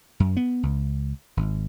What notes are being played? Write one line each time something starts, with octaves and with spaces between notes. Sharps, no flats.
F#2
B3
C#2
G#1